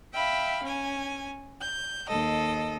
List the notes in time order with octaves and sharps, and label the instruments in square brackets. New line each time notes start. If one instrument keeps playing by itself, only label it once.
[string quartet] E5 F5 G5 B5
C#4 G#5
G6
D#2 A4 D#5